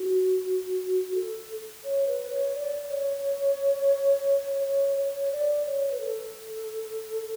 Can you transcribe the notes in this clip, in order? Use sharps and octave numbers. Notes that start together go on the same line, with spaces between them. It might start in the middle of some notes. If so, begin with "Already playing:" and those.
Already playing: F#4
A4
C#5
B4
C#5
D5
C#5
C#5
C#5
D5
C#5
B4
A4